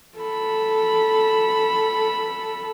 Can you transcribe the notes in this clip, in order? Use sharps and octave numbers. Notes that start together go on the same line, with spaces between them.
A4 B5